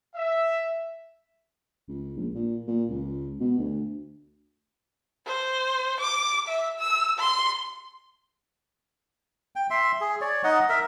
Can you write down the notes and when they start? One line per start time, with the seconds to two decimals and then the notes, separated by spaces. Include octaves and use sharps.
0.16 E5
1.88 C#2
2.17 A#1
2.34 A#2
2.68 A#2
2.90 C#2
3.40 B2
3.59 D2
5.27 C5
6.00 D6
6.49 E5
6.80 E6
7.19 C6
9.56 G5
9.70 E5 C6
10.01 G#4
10.21 C#5 D5
10.44 D#4 D#5 F#5
10.69 A#4 E5